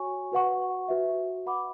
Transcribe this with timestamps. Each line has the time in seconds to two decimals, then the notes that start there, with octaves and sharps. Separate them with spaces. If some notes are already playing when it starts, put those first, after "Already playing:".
Already playing: F#4 C#5 G#5 C#6
0.32 F#4 B4 F#5 C#6
0.88 F#4 B4 E5
1.46 B4 F#5 B5 D6